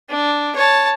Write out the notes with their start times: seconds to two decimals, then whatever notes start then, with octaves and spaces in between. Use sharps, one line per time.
0.10 D4
0.56 C#5 A5